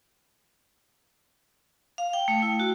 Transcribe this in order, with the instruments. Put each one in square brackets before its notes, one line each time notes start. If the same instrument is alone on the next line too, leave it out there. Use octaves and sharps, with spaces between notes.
[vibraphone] F5
G5
A3
E4
F#4